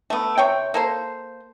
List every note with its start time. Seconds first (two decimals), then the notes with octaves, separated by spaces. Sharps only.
0.10 A3 B3
0.38 C3 C#5 G5
0.74 A#3 A4 C5